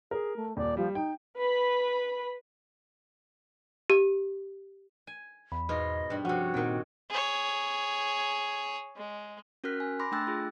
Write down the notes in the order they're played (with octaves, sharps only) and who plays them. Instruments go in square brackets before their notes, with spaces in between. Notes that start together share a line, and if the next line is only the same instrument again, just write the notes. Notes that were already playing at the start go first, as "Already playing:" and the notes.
[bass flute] G#4 [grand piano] A#4
[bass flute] A3
[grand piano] D#1 [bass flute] D5
[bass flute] F3 [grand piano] G3
[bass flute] D#4 [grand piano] G5
[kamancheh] B4 B5
[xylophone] G4
[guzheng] G#5
[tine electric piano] E2 [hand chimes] B5
[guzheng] G#2 B2 F4 [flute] D#5
[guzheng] G2 G3
[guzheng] C3 C#4 [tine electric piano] F3 [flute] F#4 [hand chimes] F#5
[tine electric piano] A#2 C4 D#4 [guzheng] D#3 G5
[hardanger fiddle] G#4 C#5
G#3
[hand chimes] C#4 F#4 A#4 F6 F#6 B6
G#5
B5 C6 D6 A#6
A3 D4 G5 E6 F#6 A6
F4 G#4